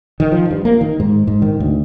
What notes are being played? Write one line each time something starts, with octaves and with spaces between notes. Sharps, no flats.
D#3
F3
G2
A#3
D#3
G#2
G#2
D#3
D2